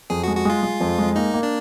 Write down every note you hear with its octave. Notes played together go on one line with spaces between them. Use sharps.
F2 G#4
F#4
G#3
F#4
G#3 F4
G#3
F2
G#3
A#3 D#4
A#3
D4